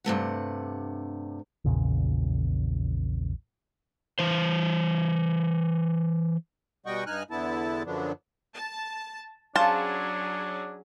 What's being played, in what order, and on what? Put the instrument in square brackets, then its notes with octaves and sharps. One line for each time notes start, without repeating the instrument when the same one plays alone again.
[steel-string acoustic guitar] G2 C3 A3 F#5
[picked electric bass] A#1 E2 A#2 C#3
[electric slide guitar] E3 C5
[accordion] B2 G3 D#5 F#5 G5 C#6
G2 D#4 G#5 F6 F#6
E2 D3 B3 E4 A5
F#2 D3 F3 F#3 B3 D4
[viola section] A5
[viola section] F#3 C#4 G#4 [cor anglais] D4 [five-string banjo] C5 A5 [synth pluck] F5 A6